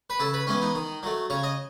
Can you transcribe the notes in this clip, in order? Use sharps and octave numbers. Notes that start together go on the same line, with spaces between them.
B4
C#3 A4
B4
E3 G#3 B3 C#4
D#4
D#3
F#3 A3
C#3 C#5
D#5